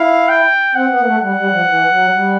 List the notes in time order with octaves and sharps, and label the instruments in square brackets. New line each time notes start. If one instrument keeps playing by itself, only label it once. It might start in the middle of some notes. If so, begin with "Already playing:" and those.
Already playing: [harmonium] E4 [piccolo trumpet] F5
[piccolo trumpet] G5
[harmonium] C4 [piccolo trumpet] F#5
[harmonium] B3
A#3
A3
[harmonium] G3 [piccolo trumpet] F#5
[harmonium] G3
F3
E3
F#3
G3